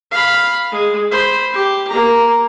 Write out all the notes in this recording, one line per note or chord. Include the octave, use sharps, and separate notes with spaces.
F5 B5
G#3
C5 B5
G4
A#3 A#5